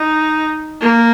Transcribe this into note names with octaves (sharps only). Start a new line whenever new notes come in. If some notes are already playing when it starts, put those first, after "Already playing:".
Already playing: D#4
A#3